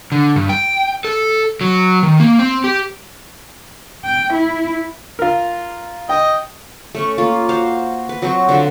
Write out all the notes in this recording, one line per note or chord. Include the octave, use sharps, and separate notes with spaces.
D3
G2
G5
A4
F#3
D#3
A#3
C4
G4
G5
E4
F4 A#4
D#5 G5
A3 C#4 C#6
A#3 F4
F#4 C5 F5
B4
F#3 C4 F#4 C#6
D3 F3 F#4 A4